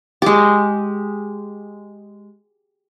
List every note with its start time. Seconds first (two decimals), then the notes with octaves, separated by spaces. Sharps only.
0.22 G#3 G4